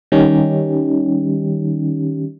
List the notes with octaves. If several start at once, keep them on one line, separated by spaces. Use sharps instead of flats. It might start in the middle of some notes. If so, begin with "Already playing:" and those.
D#3 G3 C#4 D#4 G4